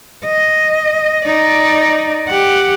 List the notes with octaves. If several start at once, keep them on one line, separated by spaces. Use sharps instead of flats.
D#5
D#4 D5
G4 F#5